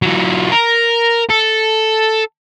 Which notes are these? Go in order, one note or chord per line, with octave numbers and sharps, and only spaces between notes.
E3 F#3
A#4
A4